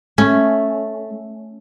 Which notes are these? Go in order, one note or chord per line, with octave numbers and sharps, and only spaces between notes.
A3 C#4